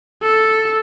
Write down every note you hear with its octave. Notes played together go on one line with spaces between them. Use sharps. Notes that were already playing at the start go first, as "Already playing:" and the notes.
A4